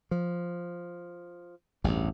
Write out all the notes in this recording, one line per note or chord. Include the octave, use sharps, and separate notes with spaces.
F3
A1 E2 G2